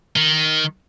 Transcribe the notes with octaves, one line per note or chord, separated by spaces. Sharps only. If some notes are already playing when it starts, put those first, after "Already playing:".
D#3